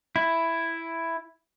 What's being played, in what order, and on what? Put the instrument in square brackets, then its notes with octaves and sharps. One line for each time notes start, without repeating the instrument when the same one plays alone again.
[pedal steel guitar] E4